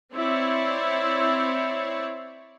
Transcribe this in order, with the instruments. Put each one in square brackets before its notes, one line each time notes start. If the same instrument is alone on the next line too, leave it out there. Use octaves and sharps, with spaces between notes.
[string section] C4 E4 C#5 D5